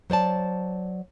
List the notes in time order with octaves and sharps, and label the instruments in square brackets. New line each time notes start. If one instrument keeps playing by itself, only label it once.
[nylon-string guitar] F#3 C5 D5 A5